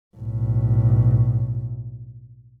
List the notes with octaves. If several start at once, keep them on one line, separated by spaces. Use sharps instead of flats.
B1 A2